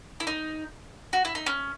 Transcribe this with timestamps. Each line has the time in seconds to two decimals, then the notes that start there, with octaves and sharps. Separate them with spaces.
0.20 E4
0.27 D#4
1.13 F#4
1.25 E4
1.35 D#4
1.46 C#4